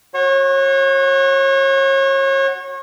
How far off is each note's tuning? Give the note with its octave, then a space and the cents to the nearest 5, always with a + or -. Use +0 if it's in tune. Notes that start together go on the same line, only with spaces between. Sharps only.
F#4 +0 C#5 -35